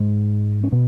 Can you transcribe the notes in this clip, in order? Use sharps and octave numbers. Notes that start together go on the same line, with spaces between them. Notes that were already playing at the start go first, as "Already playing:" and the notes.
Already playing: G#2 G#3
C#4
B2 B3